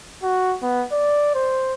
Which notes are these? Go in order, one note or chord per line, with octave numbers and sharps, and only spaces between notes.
F#4
B3
D5
C5